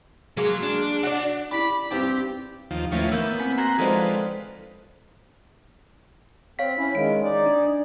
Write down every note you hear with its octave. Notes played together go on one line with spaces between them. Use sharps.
F#3 G#3 A#3
D4
F#4 D5
C#4 E4 G4 D5 B5
G2 C4 D#4 G4 B4 D6
D#2 F3
D#2 A2 E3 F3 C#4
A#3 B3 E6 G6
C4 G#5 B6
F#4 A#5 C6 G#6 A#6
D3 D#3 F3 G#3 A4 B4 C5
C4 C#5 F5 B6
C#4 E4
D#3 G#3 D7
D#4 D5
D4